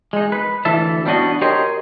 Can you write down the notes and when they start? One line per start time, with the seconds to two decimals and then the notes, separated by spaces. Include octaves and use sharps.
0.13 G#3 D#4
0.32 B4
0.65 D2 E3 A4 E5 A5
1.06 G3 B3 D4 F#4 D#5
1.41 G4 A#4 C5 C#5 D#5